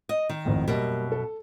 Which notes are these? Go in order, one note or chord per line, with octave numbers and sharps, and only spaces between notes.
D#5
D#3
G#1 F2 A2
F#2 B2 G3 A#3
A4